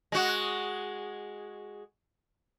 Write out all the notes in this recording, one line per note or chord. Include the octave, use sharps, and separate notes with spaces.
G#3 F#4